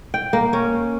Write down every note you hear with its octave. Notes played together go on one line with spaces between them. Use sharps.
G5
A#3
C#4